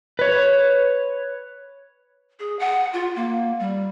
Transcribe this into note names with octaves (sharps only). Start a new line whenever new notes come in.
B4 C#5
G#4
F#5
F4
A#3
G3